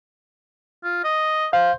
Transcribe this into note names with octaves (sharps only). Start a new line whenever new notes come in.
F4
D#5
C5 F5